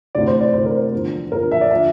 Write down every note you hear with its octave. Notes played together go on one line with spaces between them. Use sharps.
D2 C3 E3 D5
C5
D5
D2 C3 E3 C5
A#4
C5
E2 D3 F3
E2 D3 F3 A#4
E5
D5
D3 F3 E5